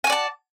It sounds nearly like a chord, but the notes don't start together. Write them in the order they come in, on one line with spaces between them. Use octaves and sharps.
G#5 F#4 D5 A5